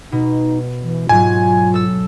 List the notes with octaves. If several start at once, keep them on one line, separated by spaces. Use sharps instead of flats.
B2 D#4
E3
G#2 F#3 F4 G#5
A4 E6